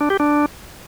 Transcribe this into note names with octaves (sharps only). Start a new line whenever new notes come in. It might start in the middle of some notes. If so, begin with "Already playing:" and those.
D4
G4
D4